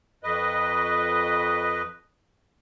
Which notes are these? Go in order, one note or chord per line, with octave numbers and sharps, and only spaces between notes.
F2 B4 D#5